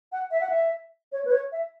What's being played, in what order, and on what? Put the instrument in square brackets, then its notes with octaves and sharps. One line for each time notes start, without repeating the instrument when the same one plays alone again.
[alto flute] F#5
E5
F#5
E5
C#5
B4
C#5
E5